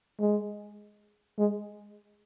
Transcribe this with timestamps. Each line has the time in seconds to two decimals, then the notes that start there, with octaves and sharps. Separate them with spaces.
0.20 G#3
1.38 G#3